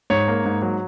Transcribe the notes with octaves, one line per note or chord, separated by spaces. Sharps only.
G#2 C#5
A#3
G#2
F#3